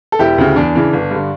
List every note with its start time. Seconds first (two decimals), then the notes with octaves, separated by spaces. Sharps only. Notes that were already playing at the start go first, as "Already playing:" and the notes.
0.12 A4
0.19 E1 E4 G4
0.38 D2 C#3
0.56 E2 D4
0.75 C#3 E3
0.93 G1
1.11 G2 D3